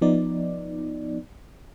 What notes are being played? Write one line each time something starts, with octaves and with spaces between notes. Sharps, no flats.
F3 B3 D#4 D5